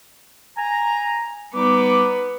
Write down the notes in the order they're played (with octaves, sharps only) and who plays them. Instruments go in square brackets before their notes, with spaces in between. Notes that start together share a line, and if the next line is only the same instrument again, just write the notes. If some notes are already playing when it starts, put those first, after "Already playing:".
[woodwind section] G#5 A#5
[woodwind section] G3 D#4 D6 [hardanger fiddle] B3